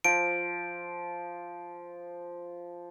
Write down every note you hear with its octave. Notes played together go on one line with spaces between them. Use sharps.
F3 D7